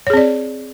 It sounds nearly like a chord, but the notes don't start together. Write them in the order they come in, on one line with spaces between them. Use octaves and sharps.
C#5 G#4 C4 D5